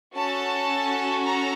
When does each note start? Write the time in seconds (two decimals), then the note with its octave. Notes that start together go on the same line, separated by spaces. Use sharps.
0.16 C#4 F#4 A4 A5
1.25 A#5